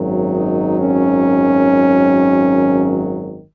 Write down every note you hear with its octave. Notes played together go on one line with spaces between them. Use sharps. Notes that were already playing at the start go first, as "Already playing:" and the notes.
Already playing: G#1 F#2 D#3 F#3 D#4
D#4
C#4